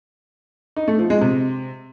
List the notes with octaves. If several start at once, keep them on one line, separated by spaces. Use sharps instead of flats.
D#4
A3
F3
G#3
C3